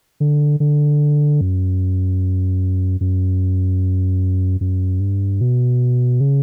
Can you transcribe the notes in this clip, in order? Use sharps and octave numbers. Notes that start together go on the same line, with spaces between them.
D3
D3
F#2
F#2
F#2
G2
B2
C#3